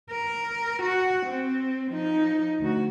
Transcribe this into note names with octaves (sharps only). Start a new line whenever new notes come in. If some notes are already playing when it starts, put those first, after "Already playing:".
A#4
F#4 F#5
C4
F3 D#4
D2 F#4